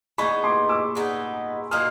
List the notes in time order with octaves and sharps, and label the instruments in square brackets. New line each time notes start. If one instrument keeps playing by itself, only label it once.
[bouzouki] E3 G#3 B3 D#4 [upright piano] B5 C#6
[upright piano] C6 D6
D6 E6
[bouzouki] G#3 B3 D#4
[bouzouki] A#2 F#3 A#3 D#4 [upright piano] D#6 F6